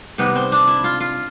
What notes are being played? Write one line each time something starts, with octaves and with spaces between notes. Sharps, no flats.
C3 D#3 G3 B3
C4
D4
E4
F4
F4